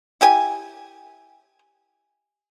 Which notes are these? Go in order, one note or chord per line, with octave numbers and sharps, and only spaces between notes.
E4 G4 G#5